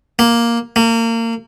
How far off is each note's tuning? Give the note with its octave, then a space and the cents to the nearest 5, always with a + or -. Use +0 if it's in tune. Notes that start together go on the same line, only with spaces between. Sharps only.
A#3 +5
A#3 -30